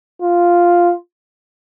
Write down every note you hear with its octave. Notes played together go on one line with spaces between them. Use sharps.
F4